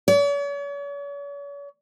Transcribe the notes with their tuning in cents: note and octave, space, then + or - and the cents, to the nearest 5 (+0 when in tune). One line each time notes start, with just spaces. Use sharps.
C#5 +45